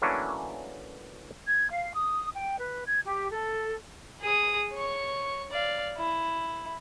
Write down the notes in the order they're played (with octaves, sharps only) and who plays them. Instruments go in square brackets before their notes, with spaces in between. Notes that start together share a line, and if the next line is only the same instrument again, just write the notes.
[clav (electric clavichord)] E3 F#3 A3 A#3 C#4 D4
[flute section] G#6
F5
D#6
G5
B4
G#6
G4
A4
[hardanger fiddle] G#4 D#6
C#5 C#6
D5 F5
E4